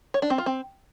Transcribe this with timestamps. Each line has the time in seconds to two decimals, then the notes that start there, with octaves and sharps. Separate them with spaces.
0.14 C#5
0.22 D4
0.30 C4
0.38 F4
0.46 C4